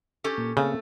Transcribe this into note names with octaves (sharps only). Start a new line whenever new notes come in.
C#4 G4 A4
A#2 A#3
C#3 A3 A#3 C4 C#4